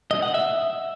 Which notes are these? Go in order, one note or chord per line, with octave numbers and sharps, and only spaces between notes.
D#5
F#5
E5